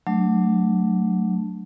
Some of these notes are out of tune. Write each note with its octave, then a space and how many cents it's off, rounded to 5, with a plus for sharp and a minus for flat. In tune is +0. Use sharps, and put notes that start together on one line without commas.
F#3 +0 A3 +0 D4 +0